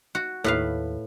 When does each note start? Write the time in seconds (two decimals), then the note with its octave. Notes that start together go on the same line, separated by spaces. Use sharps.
0.15 F#4
0.44 D#2 A2 B4 F5